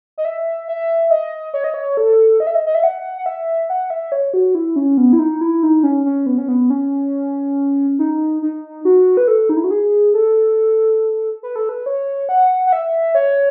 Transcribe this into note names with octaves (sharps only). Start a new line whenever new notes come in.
D#5
E5
E5
D#5
C#5
D#5
C#5
A4
D#5
E5
D#5
D#5
E5
F#5
F#5
E5
F#5
E5
C#5
F#4
E4
C#4
B3
E4
D#4
E4
D#4
C#4
C#4
B3
C#4
B3
C#4
D#4
D#4
F#4
B4
A4
D#4
E4
F#4
G#4
A4
B4
A4
B4
C#5
F#5
F#5
E5
C#5